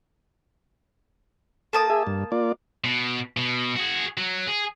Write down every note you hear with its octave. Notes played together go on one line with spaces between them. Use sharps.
A#3 A4 A5 D#6
G#4 E5
G2
A#3 F4 D5
B2
B2
F#4 G#4
F#3
G#4